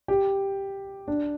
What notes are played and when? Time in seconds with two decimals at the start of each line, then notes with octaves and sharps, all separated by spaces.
0.08 G4
1.08 D4